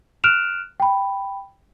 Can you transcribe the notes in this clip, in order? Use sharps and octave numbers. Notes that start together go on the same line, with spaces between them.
F6 F#6 D7 E7 F7
G5 B5